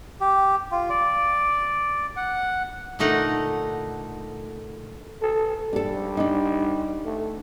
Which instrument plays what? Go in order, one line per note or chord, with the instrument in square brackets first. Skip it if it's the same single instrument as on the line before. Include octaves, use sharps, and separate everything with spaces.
[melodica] G4
F4
D5
F#5
[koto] A#2 D3 A3 D#4 F#5
[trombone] A4
[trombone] G3 [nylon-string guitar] D4 A4
[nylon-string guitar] D4 D#4
[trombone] A3